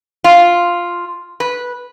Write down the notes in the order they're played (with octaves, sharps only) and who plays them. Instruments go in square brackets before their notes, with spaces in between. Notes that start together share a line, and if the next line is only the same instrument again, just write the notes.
[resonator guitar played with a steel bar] F4
B4